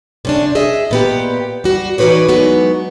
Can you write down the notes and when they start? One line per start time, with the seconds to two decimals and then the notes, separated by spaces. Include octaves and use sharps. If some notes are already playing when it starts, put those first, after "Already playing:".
0.25 C3 C#4 D4
0.55 G#4 D#5 E5
0.91 A#2 B3 G4
1.64 G3 F#4
1.98 E3 D#4 F#4 B4 C#5 D5
2.28 F#3 G#3 B3 D#4 F#4